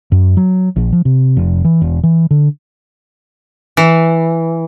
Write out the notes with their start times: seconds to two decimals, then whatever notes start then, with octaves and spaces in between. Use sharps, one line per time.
0.12 F#2
0.37 F#3
0.76 A#1
0.93 F3
1.05 C3
1.37 F1
1.65 E3
1.81 E1
2.03 E3
2.31 D3
3.77 E3